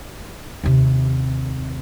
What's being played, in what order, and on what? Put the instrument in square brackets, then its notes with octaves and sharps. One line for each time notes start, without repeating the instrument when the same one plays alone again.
[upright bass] D#2 C3